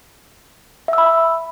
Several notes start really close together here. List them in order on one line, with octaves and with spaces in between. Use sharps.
E5 E6 B5